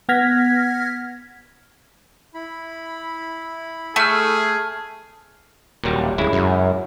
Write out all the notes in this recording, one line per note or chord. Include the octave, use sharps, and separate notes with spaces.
B3 F#5 F6 G#6 A#6 B6
E4 B5
A3 G#4 A5 F6
D#1 A#2 F#3 G3
D1 C#3 G#3 E4
F#2